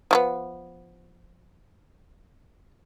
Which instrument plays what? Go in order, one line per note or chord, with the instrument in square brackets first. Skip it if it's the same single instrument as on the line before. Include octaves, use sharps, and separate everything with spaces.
[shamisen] F3 A3 B3